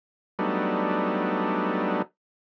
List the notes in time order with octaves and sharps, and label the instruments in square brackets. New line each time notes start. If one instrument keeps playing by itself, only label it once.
[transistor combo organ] F#3 G3 A3 B3 D4 D#4